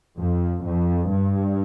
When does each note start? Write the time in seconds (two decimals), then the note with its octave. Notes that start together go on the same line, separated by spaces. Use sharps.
0.18 F2
0.65 F2
1.10 G2